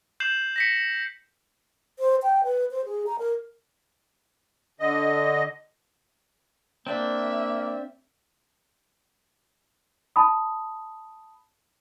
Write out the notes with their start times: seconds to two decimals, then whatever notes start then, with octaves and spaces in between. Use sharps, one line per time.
0.20 G6 C7 E7 F#7
0.56 A#6 B6 C#7
1.99 C5
2.23 G5
2.44 B4
2.71 C5
2.85 G#4
3.06 A#5
3.19 A#4
4.80 D3 D#5
6.87 A#3 C4 D4 E5
10.16 A5 B5 D#6